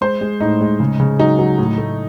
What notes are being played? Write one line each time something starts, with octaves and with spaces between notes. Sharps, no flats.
G#3 C5
G#3
A2 D#4
G#3
C#3
C#3
F#3 D#4
F#3
A2
A3